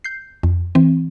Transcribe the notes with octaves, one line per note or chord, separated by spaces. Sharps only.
G6 C7
F2
E3 C4